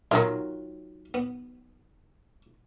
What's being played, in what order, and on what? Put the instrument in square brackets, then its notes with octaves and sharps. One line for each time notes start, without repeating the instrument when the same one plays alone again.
[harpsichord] B1 [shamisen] D#3 F#3 F4
[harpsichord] B3